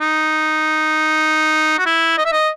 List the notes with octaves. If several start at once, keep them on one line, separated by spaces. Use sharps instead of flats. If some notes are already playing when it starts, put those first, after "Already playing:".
D#4
F#4
E4
D#5
E5
D#5